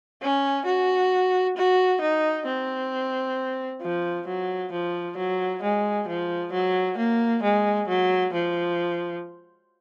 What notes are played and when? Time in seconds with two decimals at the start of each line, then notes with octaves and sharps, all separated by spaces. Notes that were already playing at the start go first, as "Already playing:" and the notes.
0.22 C#4
0.66 F#4
1.57 F#4
2.02 D#4
2.46 C4
3.82 F3
4.27 F#3
4.72 F3
5.17 F#3
5.63 G#3
6.08 F3
6.53 F#3
6.98 A#3
7.43 G#3
7.88 F#3
8.33 F3